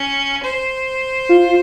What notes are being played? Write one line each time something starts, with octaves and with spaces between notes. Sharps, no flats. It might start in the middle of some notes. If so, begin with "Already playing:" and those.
Already playing: C#4
C5
F4